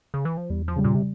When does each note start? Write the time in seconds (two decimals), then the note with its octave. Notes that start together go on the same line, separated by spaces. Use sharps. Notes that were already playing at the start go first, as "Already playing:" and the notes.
0.14 C#3
0.25 E3
0.37 F3
0.50 E2 G3
0.68 F3
0.76 C#3 G3
0.84 A#2
0.95 C3